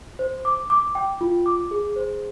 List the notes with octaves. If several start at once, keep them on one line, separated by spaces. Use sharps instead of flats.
C5
D6
D6
G5
F4
D6
G#4
C5